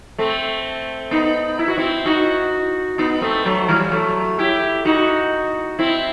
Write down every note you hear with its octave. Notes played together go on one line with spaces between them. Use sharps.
A3 C4
B3 D#4
E4
F#4
C4 E4
D#4 F#4
B3 D#4
A3 C4
F#3 A3
E3 G3
F#3 A3
E4 G4
D#4 F#4
C4 E4